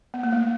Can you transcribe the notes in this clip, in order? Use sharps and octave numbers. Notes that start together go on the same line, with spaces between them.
B3
A#3
A3